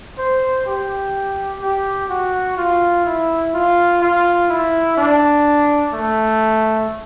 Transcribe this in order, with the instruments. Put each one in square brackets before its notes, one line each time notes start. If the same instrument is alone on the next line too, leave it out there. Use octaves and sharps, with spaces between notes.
[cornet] C5
G4
G4
F#4
F4
E4
F4
F4
E4
D4
A3